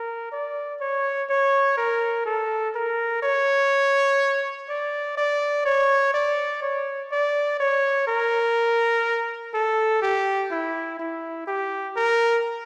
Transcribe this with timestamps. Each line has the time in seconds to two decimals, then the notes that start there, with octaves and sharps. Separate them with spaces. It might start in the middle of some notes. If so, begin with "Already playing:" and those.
Already playing: A#4
0.32 D5
0.80 C#5
1.30 C#5
1.77 A#4
2.26 A4
2.75 A#4
3.23 C#5
4.69 D5
5.17 D5
5.65 C#5
6.14 D5
6.62 C#5
7.11 D5
7.60 C#5
8.08 A#4
9.54 A4
10.02 G4
10.51 E4
10.99 E4
11.47 G4
11.96 A#4